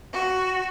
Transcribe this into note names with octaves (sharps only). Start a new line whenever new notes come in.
F#4